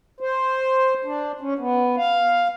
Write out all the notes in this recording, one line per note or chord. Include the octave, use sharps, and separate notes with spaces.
C5
D4
C#4
B3
F5